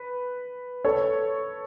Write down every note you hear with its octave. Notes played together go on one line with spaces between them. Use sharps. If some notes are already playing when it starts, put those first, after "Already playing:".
Already playing: B4
A4 C#5